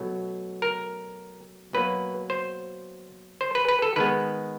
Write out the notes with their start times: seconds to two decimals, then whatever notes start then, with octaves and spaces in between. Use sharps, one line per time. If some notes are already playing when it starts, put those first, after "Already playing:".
Already playing: B2 F#3 A3
0.62 A#4
1.73 B2 F#3 A#3 B4
2.30 C5
3.41 C5
3.55 B4
3.68 B4
3.82 A4
3.96 D#3 G#3 B3 B4